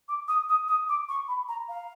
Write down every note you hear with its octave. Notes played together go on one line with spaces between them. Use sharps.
D6
D#6
D#6
D#6
D6
C#6
B5
A#5
F5